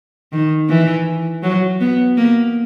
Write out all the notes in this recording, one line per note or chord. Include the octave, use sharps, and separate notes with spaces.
D#3
E3
F#3
B3
A#3